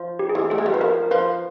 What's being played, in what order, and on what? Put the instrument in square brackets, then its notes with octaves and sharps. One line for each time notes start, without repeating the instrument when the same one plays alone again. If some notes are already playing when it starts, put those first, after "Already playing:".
Already playing: [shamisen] F3
[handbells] G4
G#4
[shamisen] E3 [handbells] G4
[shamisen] A3 [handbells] G#4
[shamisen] G#3
G3
[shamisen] F#3 [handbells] B4
[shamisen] F3 [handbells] A#4
[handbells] A#4
[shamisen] F3 [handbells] B4